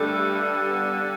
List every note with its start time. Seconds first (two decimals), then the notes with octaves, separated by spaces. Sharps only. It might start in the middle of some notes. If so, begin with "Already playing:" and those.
Already playing: G2 D3 G3 A3
0.69 B3